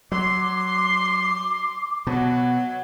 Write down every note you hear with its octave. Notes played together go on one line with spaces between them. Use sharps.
F#3 C6 D6
B2 F#3